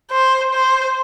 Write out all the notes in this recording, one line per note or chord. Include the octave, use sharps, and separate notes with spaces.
C5
C5